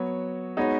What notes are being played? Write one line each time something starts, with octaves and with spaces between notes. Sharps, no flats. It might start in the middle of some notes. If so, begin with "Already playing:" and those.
Already playing: F#3 B3 F#4 C#5
G#3 B3 D#4 F#4 C#5